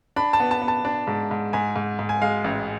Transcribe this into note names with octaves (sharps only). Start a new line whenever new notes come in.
D4 B5
A5
B3
A5
B3
A5
D4
G#2
G#2
G#2 G#5
G#2
G#2
G#5
G#3 F5
A1